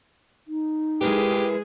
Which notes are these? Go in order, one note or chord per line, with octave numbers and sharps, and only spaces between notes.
D#4
G#3 E4 G4 G#4 A#4 B4